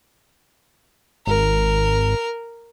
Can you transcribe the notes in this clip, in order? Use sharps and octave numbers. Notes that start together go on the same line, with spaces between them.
G#1 A#4